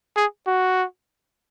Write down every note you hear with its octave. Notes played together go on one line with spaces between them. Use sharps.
G#4
F#4